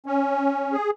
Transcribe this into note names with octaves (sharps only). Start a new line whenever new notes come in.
C#4
G#4